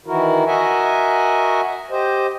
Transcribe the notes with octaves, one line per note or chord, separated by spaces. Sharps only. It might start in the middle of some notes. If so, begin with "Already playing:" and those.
D#3 E3 E4 F#4 A#4
F#4 A#4 D#5 E5 F#5 G#5
G4 C5 D#5